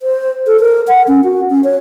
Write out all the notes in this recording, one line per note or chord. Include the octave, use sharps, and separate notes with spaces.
C5
A4
A#4
F#5
C#4
F#4
C#4
C#5